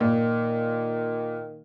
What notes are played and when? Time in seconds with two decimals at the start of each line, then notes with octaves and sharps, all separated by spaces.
0.01 A#2 D#3